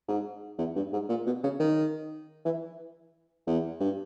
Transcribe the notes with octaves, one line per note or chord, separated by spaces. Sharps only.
G#2
E2
G2
G#2
A#2
B2
C#3
D#3
E3
E2
G2